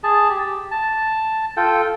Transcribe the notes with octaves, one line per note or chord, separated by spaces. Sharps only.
G#4 A5
G4
A5
F4 A4 G5